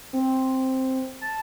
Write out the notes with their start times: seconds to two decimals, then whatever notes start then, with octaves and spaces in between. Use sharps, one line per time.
0.13 C4
1.21 A5